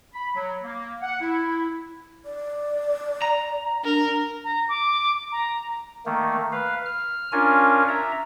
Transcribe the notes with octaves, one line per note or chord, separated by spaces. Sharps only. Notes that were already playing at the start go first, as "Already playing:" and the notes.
B5
F#3
A#3
F#5
E4
D5
A#5
D4 A#4
A#5
D6
A#5
D#3 A3 A#3
B4 F5
F6
C#4 D4 F4 A#4 G#5
E5 A#5